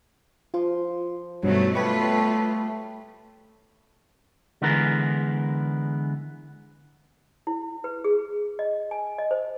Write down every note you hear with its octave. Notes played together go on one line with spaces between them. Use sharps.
F3 F4 C6
G2 B2 D#3 F#3 A3
G3 A3 B3 F4 B4 C#5 C#6
D3 E3 G#3 B3 A#4
E4
B4
G#4
D#5
G#5
D#5
C5